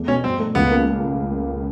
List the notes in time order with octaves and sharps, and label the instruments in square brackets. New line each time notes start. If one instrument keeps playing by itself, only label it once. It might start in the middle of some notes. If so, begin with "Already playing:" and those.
Already playing: [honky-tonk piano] E2 A3
[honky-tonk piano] B2 [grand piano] C#4
[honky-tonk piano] G2 [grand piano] C4
[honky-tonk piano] A3
[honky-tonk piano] C#2 [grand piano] B3
[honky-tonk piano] A#3